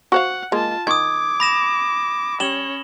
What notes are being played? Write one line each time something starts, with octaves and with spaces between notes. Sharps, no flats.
F#4 C5 F5 F#5
G#3 A#3 F4 A5
D#3 D6 D#6 G#6
B5 A#6 E7
G3 C#4 C#5 E7 F#7 G7